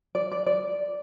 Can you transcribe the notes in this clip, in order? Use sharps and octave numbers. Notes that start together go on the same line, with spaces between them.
D5
D5
D5